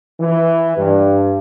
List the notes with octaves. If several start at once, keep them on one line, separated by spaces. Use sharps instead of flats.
E3
G2